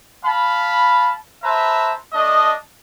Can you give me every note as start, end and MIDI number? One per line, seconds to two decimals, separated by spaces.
0.25 1.12 77
0.25 1.12 81
0.25 1.12 83
1.43 1.93 71
1.43 1.93 72
1.43 1.93 76
1.43 1.93 81
1.43 1.93 82
2.13 2.54 57
2.13 2.54 62
2.13 2.54 75